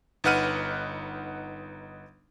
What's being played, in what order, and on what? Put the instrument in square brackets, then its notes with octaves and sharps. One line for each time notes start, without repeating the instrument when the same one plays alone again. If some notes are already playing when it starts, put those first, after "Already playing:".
[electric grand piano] G1 D#4 B4 F#5 F6 D#7